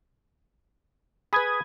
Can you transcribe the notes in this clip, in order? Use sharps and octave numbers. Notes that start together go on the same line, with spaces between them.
G#4 B4 B5 D#6 G#6